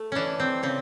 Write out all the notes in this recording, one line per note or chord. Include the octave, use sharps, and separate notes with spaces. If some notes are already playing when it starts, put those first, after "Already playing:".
Already playing: A3
E3 C#4 D4
C4
C#3 C4